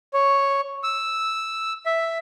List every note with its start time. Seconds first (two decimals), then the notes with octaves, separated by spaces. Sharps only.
0.14 C#5
0.84 E6
1.86 E5